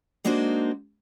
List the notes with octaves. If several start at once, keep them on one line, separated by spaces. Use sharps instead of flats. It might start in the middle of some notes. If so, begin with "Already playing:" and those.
G#3 A#3 D4 D#4 F#4 C5